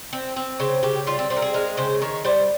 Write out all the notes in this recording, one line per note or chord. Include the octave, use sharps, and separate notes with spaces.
C4
C4
C#3 C5
C#3 G4
G3 F4
C4
C4 G4
A#4
G#4
G#3 A#4
C#3 C5
D#3 C#5
G3 C5